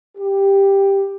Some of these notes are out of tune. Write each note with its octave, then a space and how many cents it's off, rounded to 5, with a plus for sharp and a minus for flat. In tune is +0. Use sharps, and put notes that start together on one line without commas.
G4 +5